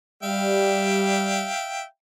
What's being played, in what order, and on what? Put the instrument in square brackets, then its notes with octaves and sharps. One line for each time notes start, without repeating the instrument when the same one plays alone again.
[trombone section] G3 [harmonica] E5 F5 G5